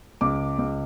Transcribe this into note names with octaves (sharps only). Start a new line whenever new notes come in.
C#2 D6
C#2